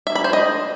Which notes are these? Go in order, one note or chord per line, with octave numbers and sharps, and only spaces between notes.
E5
B5
C5
D#5